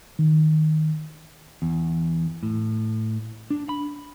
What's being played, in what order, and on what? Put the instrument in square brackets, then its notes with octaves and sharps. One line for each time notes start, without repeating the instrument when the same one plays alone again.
[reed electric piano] D#3
[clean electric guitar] E2
A2
D4
B5